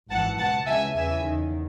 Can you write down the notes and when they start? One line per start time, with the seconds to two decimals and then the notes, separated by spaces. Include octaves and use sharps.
0.10 G#1 F#2 E3 F#5 A5
0.38 C#2 B2 F#5 A5
0.66 C#2 C#3 E3 E5 G#5
0.95 E2 C#3 E3 E5 G#5
1.24 E2 D#3